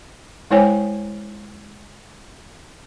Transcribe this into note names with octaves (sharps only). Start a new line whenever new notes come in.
G#3 E4 C5 C#5 G5 G#5